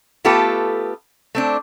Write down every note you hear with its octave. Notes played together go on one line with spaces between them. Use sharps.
A3 B3 F4 G4 A4 B4
A3 C4 D4